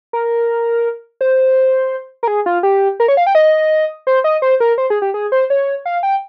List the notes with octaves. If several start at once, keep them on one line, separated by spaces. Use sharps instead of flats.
A#4
C5
A#4
G#4
F4
G4
A#4
C#5
F5
G5
D#5
C5
D#5
C5
A#4
C5
G#4
G4
G#4
C5
C#5
F5
G5